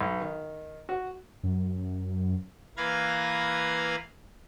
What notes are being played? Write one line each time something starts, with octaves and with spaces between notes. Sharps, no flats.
B1
D#3
F#4
F#2
E3 A#3 B4 F5 G#6 A#6